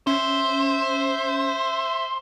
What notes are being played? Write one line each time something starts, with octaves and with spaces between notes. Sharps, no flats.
C#4 C5 E5